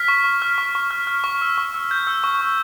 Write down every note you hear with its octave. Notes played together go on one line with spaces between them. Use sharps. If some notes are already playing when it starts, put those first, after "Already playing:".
Already playing: F6 B6
C#6
C#6
F6
C#6
C#6
F6
F6
C#6
E6
C#6
E6
G6
E6
C#6
C#6